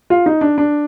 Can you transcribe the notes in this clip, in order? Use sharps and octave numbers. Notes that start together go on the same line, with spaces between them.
F4
D#4
D4
D4